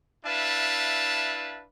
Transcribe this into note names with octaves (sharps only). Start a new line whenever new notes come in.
D4 E4 B4 E5 F5 A5